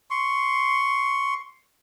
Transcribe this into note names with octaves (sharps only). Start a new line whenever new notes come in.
C6 C#6